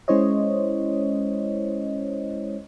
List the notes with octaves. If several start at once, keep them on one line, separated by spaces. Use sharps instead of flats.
G#3 C#4 E4 C5 C#5 D#5